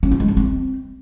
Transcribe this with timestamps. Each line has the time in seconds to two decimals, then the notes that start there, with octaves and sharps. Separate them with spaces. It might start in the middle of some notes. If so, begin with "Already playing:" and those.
0.03 C#4
0.11 F4
0.20 G#3
0.28 C#4
0.37 C4